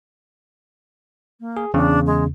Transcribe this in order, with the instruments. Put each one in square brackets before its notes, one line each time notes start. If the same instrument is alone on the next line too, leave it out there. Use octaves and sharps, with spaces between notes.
[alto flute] A#3
[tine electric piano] G#4
[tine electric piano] E2 C#3 [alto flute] D4
[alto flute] G#3